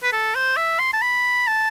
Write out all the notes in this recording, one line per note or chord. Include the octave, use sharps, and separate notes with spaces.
B4
A4
C5
E5
C6
A5
B5
A5